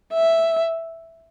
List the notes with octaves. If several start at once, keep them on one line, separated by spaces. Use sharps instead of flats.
E5